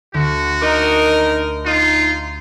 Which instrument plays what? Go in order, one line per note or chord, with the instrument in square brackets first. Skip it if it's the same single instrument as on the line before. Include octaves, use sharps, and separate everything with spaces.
[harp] D2 [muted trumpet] F#4
[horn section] D#4 A#4 [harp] D6 A#6 D7
[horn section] D#4 [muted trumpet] F4